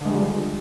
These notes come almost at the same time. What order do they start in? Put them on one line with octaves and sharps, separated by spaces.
D3 G#3 G3 F3